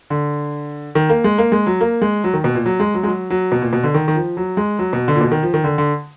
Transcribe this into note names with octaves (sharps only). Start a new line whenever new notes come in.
D3
D#3
A#3
G#3
A#3
G#3
F#3
A#3
G#3
F#3
D#3
B2
A#2
F#3
G#3
F#3
G#3
F#3
F#3
B2
A#2
B2
D3
D#3
D#3
F3
F#3
G#3
F#3
B2
D3
A#2
B2
D#3
F3
D#3
D3
D3